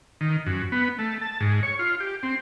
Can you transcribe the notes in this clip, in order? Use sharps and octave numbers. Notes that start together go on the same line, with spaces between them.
D#3
F#2
B3
A3
A5
G#2
C#5
F4
G4
C4